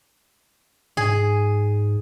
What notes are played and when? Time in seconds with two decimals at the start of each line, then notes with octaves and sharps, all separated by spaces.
0.97 G#2 G#4